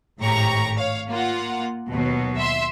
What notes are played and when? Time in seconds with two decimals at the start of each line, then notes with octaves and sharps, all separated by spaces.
0.21 G#1 A2 G4 A#5 C#6
0.77 C#5 F5
1.09 A#3 F4 F#5
1.89 D#2 B2 F#3
2.37 E5 C6